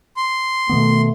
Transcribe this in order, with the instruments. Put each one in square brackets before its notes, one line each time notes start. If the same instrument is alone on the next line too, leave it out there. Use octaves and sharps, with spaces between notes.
[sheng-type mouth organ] C6
[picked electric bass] B2 D#3 B3 [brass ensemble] A3